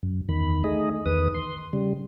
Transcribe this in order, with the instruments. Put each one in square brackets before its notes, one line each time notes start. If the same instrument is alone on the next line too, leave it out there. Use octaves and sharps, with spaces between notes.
[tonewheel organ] F#2
E2 D#3 B5
A3 D#4 G#4 D#5
E2 D#3 B4 D#6
C6
C#3 G3